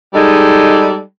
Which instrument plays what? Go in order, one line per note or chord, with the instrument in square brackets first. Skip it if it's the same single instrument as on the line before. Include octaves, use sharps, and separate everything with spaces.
[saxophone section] G3 G#3 D#4 A4